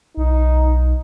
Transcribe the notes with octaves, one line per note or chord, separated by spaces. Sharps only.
B1 D#4